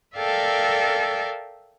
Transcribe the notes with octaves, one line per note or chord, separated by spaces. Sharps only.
A4 A#4 D5 E5 F5 G5